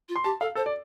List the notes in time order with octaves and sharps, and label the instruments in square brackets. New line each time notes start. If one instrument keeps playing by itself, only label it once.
[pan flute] F4
[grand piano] C6
[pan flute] G4 [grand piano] A5
[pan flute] A4 [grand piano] F5
[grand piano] A4 [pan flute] C5
[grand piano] D5